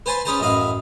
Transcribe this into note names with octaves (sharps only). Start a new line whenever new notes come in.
B4 C5 G#5 A5 B5 C6
C#4 G#4 B4 C5 A5 A#5
A1 F#2 D#5 F5 B5